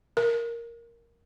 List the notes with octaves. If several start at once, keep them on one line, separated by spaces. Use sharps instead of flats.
A#4